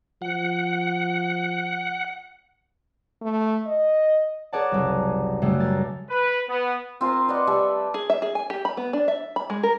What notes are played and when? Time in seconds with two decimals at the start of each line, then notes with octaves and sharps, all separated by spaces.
0.22 F3 F#5
3.22 A3
3.67 D#5
4.53 G#4 A#4 C#5 D5 F#5 A5
4.72 F#1 C2
5.42 F#2 C#3 G3 A3
5.60 C#2 A#4 A6
6.10 B4
6.48 B3
7.01 C4 F4 A#4 C5
7.28 B4 D5 D#5 F#5
7.47 G3 A4 E5
7.94 G#4
8.10 E5
8.22 G#4
8.35 G#5
8.50 G4
8.65 B5
8.77 B3
8.93 D4
9.08 E5
9.36 B5
9.50 G#3
9.63 A#4